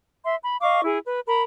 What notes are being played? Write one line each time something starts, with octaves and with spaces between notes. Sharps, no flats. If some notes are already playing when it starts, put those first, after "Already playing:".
E5 C6
B5
D#5 F5 C#6 D6
E4 G#4
B4
A#4 B5